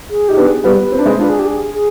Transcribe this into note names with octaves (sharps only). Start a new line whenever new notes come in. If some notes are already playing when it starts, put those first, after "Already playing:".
G#4
D#4 G4
B3 D4
G#4
G3 B3 B4
C4
D4
G#3 C4
D4 F4 B4
G#4
G4
G#4
G#4